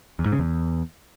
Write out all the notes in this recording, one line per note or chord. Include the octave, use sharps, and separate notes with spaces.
E2
G#2
C#3
E2